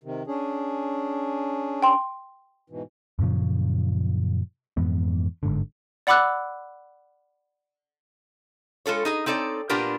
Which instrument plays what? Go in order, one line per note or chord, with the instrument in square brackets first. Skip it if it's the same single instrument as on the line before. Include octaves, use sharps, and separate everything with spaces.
[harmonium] C3 D#3
C#4 D4 G#4
[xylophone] G5 C6
[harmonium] G#2 B2 E3
[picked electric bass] F#2 A#2 C#3 F3
F2 G#2 E3 B3
G1 G#2 D3
[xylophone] D5 F#5 B5 D6 E6 F#6
[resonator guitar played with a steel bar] G#3 F4 A4 C#5
D#4 G#4 D#5
C4 D#4 A4 C#5 D5
A#2 B3 D4 F4 G4 A#4